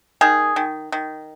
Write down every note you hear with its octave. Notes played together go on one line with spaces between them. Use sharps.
D#3 G#4
D#3
D#3